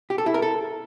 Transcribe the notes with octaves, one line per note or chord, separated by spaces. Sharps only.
G4
A4
E4
A#4
A4